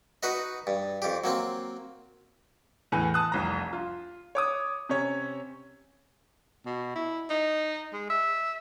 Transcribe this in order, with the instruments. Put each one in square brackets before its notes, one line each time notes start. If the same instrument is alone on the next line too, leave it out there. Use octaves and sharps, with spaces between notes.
[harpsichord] D#4 F#4 B4 D#5
G2
F2 G4
F#3 A#3 C4
[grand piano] E2 A2 E3 G#5
A5 D#6 F#6
F1 C2 A#5
F4
C#5 D6 D#6
C3 C#4 C#5
[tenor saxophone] B2
E4
D#4
G#3
E5